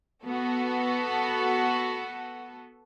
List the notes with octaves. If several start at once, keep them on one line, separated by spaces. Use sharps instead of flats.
B3 F#4 A4